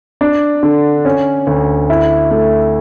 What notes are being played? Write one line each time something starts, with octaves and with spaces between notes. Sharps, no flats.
D4
D3
C#4
D2
E4
A3